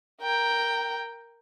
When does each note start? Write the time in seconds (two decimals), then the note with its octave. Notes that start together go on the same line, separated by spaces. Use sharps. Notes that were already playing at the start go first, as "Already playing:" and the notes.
0.22 A#4 G5